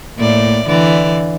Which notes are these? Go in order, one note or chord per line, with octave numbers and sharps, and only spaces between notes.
A2 A#3 D5
D3 E3 D5